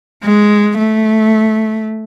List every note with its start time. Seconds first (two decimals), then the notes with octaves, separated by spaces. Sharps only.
0.24 G#3
0.78 A3